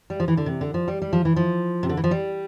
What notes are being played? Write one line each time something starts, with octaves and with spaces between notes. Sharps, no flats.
G3
F3
E3
D3
C3
D3
F3
G3
G3
F3
E3
F3
C3
D3
E3
F3
G3